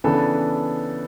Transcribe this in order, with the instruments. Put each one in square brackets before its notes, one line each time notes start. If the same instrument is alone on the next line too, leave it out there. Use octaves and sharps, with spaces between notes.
[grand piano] C#3 E3 B3 D4 A4